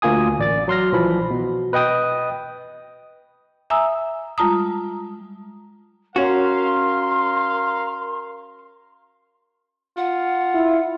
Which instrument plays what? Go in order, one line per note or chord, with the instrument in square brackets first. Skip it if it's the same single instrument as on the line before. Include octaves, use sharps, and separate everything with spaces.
[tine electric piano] D2 A#3 F4 G#5 D#6
A1 D5 A6
F#3 C6 F6 A#6
B1 E3 F3 B5
B2
B4 D#5 G5 D#6
[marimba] E5 G#5 A#5 D#6 E6
G3 G#3 F4 A5 A#5 D#6
[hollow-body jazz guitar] C#4 F#4 [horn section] A#4 F5 [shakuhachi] C6
[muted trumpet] F4 [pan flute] F#5
[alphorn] E4